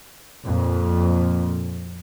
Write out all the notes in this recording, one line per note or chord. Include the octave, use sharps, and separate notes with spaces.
F2 A#2